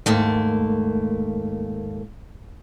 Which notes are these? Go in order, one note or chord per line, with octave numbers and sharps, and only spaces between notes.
D#2 G#2 A3 A#3